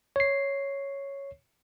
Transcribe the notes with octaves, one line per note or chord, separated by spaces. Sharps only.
C#5 C7